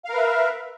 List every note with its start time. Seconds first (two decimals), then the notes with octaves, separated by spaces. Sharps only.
0.05 F5
0.09 A#4
0.14 B4
0.18 E5